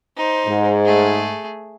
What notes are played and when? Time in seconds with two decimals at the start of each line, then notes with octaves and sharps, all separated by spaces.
0.17 D#4 C5
0.46 G#2
0.85 A3 G#4